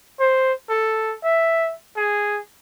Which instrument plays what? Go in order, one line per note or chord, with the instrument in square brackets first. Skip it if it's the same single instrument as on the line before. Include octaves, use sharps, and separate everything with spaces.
[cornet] C5
A4
E5
G#4